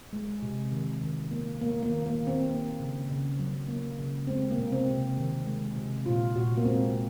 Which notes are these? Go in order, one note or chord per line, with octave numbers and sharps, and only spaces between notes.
G#3
C3
D#3
D#3
A#3
A#3
A#3
D#3
A#3
D#3
C4
A#3
C#3
C#3
F#3
A#3
C#3
G#3 C4
A#3
C3
C4
C3
D#3
G#3
C3
A#2 F4
A#2 F#4
A#3
G#3 C4